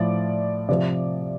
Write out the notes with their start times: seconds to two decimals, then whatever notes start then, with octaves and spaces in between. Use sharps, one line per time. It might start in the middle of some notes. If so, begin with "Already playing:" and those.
Already playing: A2 F3 D5
0.69 C3 F3 D5